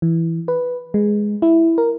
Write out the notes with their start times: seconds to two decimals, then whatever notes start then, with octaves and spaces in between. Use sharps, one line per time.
0.02 E3
0.48 B4
0.94 G#3
1.42 E4
1.78 A#4